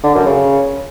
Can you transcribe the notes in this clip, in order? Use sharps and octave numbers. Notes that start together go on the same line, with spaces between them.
D3
F#2
C#3